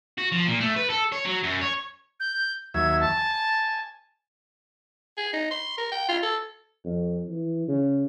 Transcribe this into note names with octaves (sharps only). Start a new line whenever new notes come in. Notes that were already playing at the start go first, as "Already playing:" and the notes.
F#4
F3
A#2
A3
B4
A4
C#5
F#3
F#2
C#5
G6
D#2 F#3 E5 G#6
A5
G#5
G#4
D#4
C6
A#4
G5
F4
A4
F2
E3
C#3